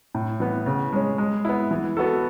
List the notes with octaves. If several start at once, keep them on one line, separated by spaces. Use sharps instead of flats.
A2
E3 B3
C#3
G#3 C#4
G#3
B3 E4
E3
B3 F#4 A4